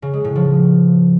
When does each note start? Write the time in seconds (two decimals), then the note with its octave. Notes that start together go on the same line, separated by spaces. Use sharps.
0.02 C#3
0.13 G#3
0.24 A2
0.35 F3